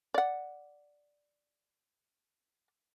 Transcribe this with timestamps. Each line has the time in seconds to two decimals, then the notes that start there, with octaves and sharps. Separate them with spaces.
0.14 D5 F#5